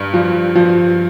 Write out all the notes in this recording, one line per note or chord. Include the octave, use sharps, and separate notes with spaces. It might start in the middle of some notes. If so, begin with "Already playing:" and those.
Already playing: G2
F3
F3